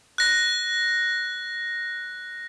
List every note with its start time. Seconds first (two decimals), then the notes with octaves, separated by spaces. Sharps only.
0.18 F#6 A#6